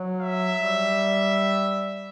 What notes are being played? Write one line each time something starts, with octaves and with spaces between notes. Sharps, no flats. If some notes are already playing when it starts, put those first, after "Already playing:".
Already playing: F#3
E5
G3